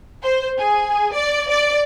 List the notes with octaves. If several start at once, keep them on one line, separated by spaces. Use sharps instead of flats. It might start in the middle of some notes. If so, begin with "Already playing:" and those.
C5
G#4
D5
D5